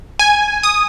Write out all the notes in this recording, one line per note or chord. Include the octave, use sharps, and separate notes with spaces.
G#5
D#6